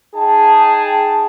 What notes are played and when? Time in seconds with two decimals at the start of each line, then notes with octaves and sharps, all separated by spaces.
0.15 D#4 G#4 G5 A5